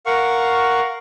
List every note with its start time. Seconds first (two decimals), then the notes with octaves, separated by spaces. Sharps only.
0.06 A#4 F5 F#5 C#6